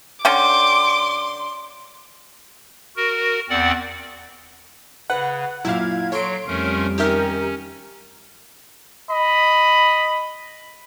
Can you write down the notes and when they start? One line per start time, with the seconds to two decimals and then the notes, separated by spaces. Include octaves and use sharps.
0.25 D3 C#4 G5 C6 D6
2.96 F#4 A#4
3.50 E2 C4 D5 F#5
5.10 C#3 B4 F#5
5.65 F#2 A#2 E4 F5 G#6
6.12 F#3 A4 C#5 C6 D7
6.47 F2 G3 A3 C#4 A#4
6.98 D#3 C#4 G4 A#4 E5 F6
9.10 D#5 B5